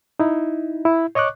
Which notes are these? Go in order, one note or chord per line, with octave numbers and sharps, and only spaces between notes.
D#4 E4
E4
C#5 D#5 C#6 D6 F#6